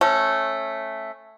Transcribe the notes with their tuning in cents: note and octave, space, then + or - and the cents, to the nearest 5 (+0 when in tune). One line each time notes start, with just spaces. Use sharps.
A3 +0 C#4 -20